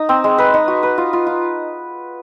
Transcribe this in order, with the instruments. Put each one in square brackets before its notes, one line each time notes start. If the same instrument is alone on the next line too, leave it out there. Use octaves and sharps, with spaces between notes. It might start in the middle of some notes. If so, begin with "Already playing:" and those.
Already playing: [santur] D#4
C4
G#3
B4
D#4
F#4
B4
F4
F4
F4